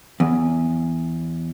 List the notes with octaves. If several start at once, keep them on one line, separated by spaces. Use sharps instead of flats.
E2